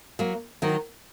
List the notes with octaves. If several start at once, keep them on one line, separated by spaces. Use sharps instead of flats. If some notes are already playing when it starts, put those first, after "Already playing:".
F#3 A#3
D#3 F#3